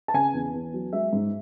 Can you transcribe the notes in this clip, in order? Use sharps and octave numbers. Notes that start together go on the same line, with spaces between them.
A5
C#3 G#5
E2
E2
F#3
G#3 E5
G#2